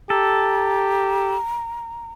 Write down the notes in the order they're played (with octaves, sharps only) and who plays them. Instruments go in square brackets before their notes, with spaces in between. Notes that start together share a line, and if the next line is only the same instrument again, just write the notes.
[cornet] G4 [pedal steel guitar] A4 [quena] A#5